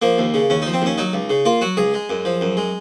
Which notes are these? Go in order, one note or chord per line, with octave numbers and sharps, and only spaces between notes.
F3 A#3
D#2
C#3
D#2 C#4
F3 D#4
C4
D#2 C#4
F#3 D#4
C#2
C#3
A#3 F4
F#3 F#4
C#2 G#4
G#3
F#2
F3
F#2
G#3